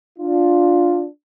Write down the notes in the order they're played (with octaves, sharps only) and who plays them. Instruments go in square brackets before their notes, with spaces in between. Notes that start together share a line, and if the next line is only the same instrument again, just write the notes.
[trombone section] D4 F4